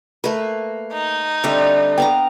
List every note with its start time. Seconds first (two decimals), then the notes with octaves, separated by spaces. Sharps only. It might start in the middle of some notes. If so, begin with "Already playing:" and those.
0.24 A3 A#3 B4
0.93 D#4
1.44 D3 G3 A3 C4 D4
1.98 B3 F5 G5 A#5